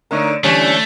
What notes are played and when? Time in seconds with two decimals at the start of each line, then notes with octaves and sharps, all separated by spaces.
0.11 D3 A3 D#4 A#4 C#5
0.44 D3 E3 G3 A3 C#4 D4 C#5